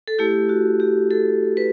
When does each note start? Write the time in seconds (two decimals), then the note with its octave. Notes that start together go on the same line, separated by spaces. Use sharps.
0.07 A4
0.19 A3 E4 G4
0.49 F#4
0.80 G4
1.11 A4
1.57 B4